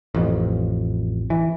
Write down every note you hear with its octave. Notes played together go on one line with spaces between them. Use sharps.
A1 F2
E3